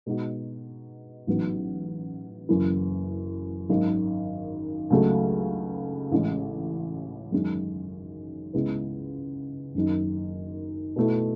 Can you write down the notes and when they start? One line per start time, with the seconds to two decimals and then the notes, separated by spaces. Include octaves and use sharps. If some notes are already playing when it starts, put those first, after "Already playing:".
0.06 B2 G#3 D#4 F#4
1.27 A1 G#2 F#3 B3
2.49 F#1 F#2 E3
3.69 G#1 F#2 D#3
4.90 C#2 C#3 F#3 A3 D#4
6.12 A1 A2 G#3 C#4
7.32 F#2 D#3 G#3 C#4
8.53 C#2 C#3 G#3 B3 E4
9.75 F#1 F#2 D#3
10.96 B2 A3 E4